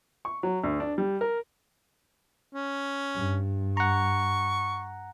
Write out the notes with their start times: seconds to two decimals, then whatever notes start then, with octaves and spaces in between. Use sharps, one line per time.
0.25 C#6
0.43 F#3
0.64 D2
0.80 D4
0.98 G3
1.21 A#4
2.54 C#4
3.15 G2
3.77 F#5 A#5 C#6